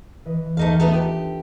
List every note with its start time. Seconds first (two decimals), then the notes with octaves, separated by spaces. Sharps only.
0.25 E3 B4 D#5
0.57 D#2 A3 D#4 F5
0.80 A3 B3 D4 D#4 F4 A4
0.94 G4